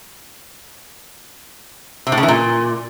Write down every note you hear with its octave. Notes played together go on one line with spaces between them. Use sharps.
C3
A2
C#3
E3
A#2